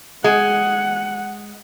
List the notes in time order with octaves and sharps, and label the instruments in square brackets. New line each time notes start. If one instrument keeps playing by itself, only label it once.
[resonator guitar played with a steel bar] G#3 [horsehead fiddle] F#5